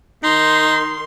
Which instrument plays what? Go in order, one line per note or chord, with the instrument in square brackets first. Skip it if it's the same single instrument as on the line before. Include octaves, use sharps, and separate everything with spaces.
[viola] D#3 C6 [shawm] D#4